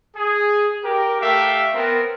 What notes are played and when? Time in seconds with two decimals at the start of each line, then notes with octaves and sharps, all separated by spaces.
0.16 G#4
0.84 G4 A#4
1.21 A3 G4 E5 F5
1.74 B3 C4 A#4